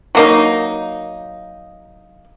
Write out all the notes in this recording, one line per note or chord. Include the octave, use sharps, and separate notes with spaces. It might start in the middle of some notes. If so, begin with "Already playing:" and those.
F#3 A#3 D#4